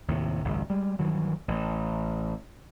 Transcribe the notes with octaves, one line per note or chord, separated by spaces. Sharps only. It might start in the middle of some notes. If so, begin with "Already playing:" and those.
D#2 A2 C3
G#1 C#2 F#2
G3 G#3
G2 D#3 E3 F#3
A1